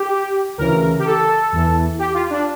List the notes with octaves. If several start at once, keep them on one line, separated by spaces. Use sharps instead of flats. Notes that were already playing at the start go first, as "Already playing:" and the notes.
Already playing: G4
D2 C#3 E3 A#4
G4
A4
E2 E3
G4
F4
D4